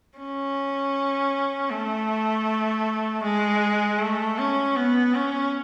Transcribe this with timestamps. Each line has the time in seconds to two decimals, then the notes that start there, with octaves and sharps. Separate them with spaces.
0.18 C#4
1.70 A3
3.23 G#3
3.99 A3
4.38 C#4
4.76 B3
5.14 C#4